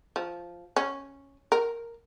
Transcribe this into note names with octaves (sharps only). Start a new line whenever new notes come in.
F3
C#4
A#4